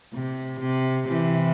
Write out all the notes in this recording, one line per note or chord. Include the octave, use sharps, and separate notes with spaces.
C3
C3
C3 E3